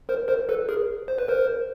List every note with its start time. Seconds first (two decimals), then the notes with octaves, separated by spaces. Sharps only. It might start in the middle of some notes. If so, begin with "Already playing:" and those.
0.09 A#4 C5
0.28 A#4 C5
0.49 A4 B4
0.69 G#4 A#4
1.08 C5
1.19 B4
1.28 A#4 C5